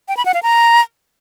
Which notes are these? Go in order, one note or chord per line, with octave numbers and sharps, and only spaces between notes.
G5
B5
F#5
F5
A#5